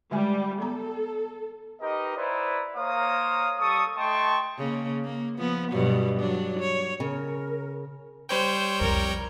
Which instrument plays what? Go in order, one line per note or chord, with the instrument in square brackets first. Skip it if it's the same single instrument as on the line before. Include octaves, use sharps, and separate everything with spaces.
[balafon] D3 G#3 G#5 [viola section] G3
[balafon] B3 A#5 [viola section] A4
[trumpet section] D#4 G4 A#4 B4 D#5
E4 B4 C5 D5 A#5
A#3 A#4 C5 C#5 F5 D#6
G3 A4 C#6 D#6
A3 D#5 G5 A5 C6 C#6
[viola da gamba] C#3 A#3
A#3
F3 B3
G2 B2 F#3
F#3 D4
C#5
[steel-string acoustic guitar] C#3 [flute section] A#4
[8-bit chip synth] G3 C#5 G5 [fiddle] C5
[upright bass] C2 F2 [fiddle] A#4